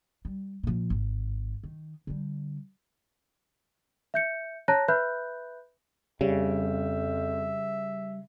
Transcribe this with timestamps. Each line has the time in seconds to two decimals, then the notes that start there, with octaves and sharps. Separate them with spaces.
0.25 G3
0.63 A#2 F3
0.90 G#1
1.63 D#3
2.07 D3 G3
4.14 E5 G6 C#7
4.68 C#5 A5 A#5 F#6 A#6
4.88 B4 E5 B5 F#6 G6
6.21 F2 C#3 G3 E5